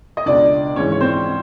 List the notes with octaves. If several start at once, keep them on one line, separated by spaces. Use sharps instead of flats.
D#5
C#2 B2 D4 D5
G#1 G#2 E3 C#4 C#5
C#5
C4 C5